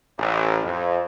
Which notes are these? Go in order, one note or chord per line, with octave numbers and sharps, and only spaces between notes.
A1
F2